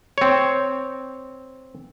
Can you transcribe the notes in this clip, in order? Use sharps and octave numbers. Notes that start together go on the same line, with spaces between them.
C4 C#5